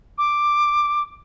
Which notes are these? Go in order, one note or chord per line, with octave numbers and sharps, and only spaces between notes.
D6